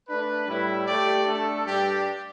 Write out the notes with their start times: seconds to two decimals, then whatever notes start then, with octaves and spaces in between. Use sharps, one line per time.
0.08 A3 D4 B4
0.48 A2 G3 E4
0.86 A3 G4 D5
1.25 A3 D4 A4
1.65 G2 G3 D4 G4 D5